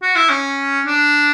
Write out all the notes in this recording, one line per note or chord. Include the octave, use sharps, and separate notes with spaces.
F#4
E4
C#4
D4